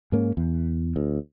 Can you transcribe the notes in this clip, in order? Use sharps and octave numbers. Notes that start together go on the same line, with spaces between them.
G#2 A#3 C#4
E2
D2